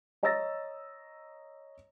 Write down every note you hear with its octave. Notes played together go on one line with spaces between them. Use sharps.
C#5 D#5 A#5 E6 A6 A#6